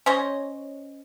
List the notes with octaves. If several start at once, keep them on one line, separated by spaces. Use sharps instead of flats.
C#4 C5 C#5 D#5